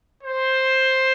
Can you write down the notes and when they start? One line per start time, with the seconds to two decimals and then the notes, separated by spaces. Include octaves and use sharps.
0.23 C5